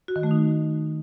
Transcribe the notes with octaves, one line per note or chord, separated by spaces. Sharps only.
F#4
D#3
A3
D#4